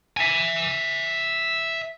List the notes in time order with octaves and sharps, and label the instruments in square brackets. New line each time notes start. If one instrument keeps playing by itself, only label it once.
[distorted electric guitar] E5 G#5